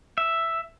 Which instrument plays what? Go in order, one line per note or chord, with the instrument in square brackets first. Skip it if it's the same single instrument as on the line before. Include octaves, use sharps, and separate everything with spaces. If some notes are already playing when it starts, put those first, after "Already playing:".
[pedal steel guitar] E5